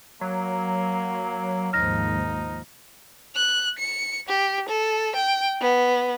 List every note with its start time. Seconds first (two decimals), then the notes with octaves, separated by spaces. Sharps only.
0.21 F#3 A#3
1.73 D#2 G#2 F3 D#4 F6 A#6
3.36 F#6
3.79 C#7
4.29 G4
4.69 A4
5.16 G5
5.61 B3